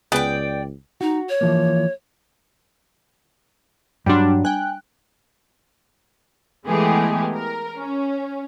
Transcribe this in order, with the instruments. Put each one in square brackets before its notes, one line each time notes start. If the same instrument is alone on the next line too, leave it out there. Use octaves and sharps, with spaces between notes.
[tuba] C#2 [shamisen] B3 G#4 B4 [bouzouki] D5 G5
[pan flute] D#4 [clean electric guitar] F#4
[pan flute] C#5
[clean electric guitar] E3 F3 A#3
[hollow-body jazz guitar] G2 F#3 C6 [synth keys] G3 D4
[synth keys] G5 F#6 [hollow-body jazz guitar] G#5
[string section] E3 G#3 A3 B3 G4 G#4
A#4
C#4